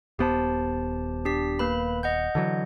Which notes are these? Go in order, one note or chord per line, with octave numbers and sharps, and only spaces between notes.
D#1 B3 G4 C5 A5
D4 G4 B6
A#3 B4 B5
D#5 F#5 G6
D3 E3 F#3